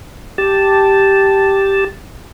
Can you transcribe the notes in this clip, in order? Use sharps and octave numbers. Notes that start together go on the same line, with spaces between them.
G4 A5